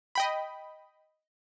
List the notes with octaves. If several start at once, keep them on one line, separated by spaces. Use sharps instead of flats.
D#5 G5 B5